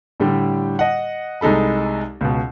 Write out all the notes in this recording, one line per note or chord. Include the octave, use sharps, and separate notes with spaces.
A2 D3 G3 G4
D#5 F#5
C2 G#3 D#4 A4 B5
C#2 B2